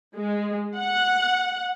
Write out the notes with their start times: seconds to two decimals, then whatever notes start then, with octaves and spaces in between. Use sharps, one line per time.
0.17 G#3
0.77 F#5